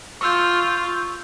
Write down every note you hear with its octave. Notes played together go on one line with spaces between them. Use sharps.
F4 C#6 E6 G6